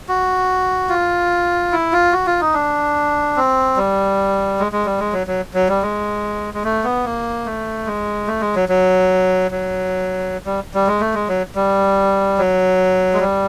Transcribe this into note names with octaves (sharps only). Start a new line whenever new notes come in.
F#4
F4
E4
F4
F#4
F4
D#4
D4
C4
G3
G#3
G#3
G3
G#3
F#3
F#3
F#3
G3
G#3
G#3
A3
B3
A#3
A3
G#3
A3
G#3
F#3
F#3
F#3
G3
G3
G#3
A3
G#3
F#3
G3
F#3
G#3
G3